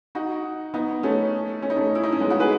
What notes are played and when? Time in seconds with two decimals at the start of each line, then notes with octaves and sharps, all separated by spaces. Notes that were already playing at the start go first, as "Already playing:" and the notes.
0.15 D#4 F#4
0.74 B3 D#4
1.03 A3 C#4
1.62 C#4
1.70 D#4
1.76 A3 C#4
1.95 E4
2.03 D#4
2.12 C#4
2.20 G#3 B3
2.30 D#4 F#4
2.40 G#4 B4